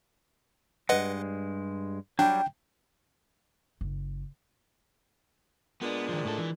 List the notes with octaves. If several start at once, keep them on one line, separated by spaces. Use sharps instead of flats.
G2 G#3 B4 D#5 F#5
F#3 G3 D4 G5
F#1
A#2 G#3 B3 D4
D#3 F3
A2 A4
E3